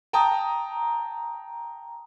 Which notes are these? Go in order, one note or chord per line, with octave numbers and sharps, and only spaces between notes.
G5 A5 A#5 D#6